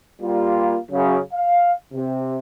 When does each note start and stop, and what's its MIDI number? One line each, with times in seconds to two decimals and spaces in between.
0.22 0.77 55
0.22 0.77 58
0.22 0.77 65
0.91 1.18 42
0.91 1.18 49
1.34 1.72 77
1.94 2.37 48